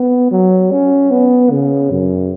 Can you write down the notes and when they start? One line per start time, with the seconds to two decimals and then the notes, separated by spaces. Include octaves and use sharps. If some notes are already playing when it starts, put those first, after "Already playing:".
Already playing: B3
0.31 F#3
0.71 C#4
1.11 B3
1.51 C#3
1.91 F#2